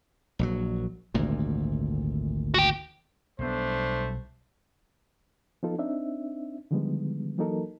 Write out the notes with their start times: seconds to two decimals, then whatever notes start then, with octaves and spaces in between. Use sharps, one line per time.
0.39 A#1 D3 F#3
1.14 G#1 D2 A#2
2.54 F#4 G5
3.39 B1 G3 A3 B3 D4 C5
5.63 F3 B3 D#4 F4 A4
5.78 C4 D4 D#4 E5
6.71 D3 D#3 F3 G3 G#3 B3
7.38 E3 F#3 A#3 D#4 A4 A#4